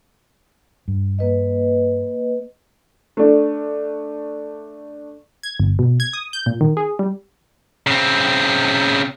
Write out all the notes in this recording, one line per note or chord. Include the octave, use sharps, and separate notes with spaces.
G2
A#3 B4 D#5
A3 D4
G#6
G1
B2
G#6
D#6
G6
A#2
D#3
G#4
G3
C#3 C4